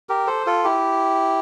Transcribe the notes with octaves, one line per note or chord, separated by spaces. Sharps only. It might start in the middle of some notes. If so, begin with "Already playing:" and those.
G4 A#4
A4 C5
F4 A4
E4 G4